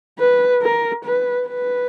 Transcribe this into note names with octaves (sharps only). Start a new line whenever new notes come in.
B4
A#4
B4
B4